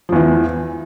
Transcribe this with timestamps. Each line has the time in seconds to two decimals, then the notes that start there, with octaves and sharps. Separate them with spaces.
0.09 F3
0.12 E2
0.16 E3